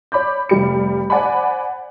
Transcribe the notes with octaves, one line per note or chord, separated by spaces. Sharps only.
C#5 B5 D6 G6
F1 G3 C#7
C5 D5 F#5 G#5 B5